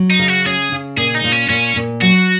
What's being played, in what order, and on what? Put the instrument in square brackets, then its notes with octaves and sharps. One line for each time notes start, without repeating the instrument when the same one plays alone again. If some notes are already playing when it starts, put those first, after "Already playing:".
Already playing: [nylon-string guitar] F#3
[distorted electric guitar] D#4
[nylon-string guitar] C#3
[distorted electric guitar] F#4
[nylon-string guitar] C#4 [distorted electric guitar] G#4
[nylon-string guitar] C#3
[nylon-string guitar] A#2 [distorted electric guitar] G#4
[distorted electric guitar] D#4
[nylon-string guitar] A#2
[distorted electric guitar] C#4
[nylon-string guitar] A#2 [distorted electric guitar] C#4
[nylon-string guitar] A#2
[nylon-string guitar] F#3 [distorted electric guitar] F#4